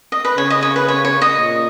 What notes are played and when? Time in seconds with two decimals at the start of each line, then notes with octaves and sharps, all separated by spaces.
0.12 D#5
0.25 B4
0.37 C#3 C#5
0.50 D#5
0.63 C#5
0.76 B4
0.89 C#5
1.05 C#5
1.22 D#5
1.38 A#2